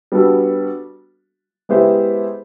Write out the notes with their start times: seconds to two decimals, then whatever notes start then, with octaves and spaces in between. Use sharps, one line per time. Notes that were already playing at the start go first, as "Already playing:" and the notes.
0.12 G3 B3 D4 F#4 A4
1.69 G#3 B3 E4 G4 C5